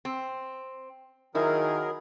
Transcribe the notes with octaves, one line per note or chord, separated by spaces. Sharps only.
C4
D#3 F#3 E4 G#4 A#4